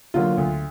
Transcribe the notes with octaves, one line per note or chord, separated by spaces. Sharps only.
D3 F#3 A#3 F4
D2